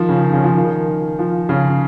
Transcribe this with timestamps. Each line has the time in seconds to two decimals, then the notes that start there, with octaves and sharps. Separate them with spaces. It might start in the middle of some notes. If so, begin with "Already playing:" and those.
Already playing: D#3 F3
0.09 C#3
0.33 C#3
0.44 F3
0.56 D#3
1.19 F3
1.49 C#3